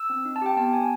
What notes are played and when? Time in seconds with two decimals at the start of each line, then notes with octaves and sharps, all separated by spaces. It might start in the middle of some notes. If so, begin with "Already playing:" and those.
Already playing: E6
0.10 C4
0.25 D#4
0.36 A5
0.42 G4 G5
0.57 B3 A5
0.73 B3 G#5